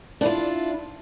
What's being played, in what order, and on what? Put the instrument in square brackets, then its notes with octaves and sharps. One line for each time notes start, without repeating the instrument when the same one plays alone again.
[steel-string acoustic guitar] D4 E4 F4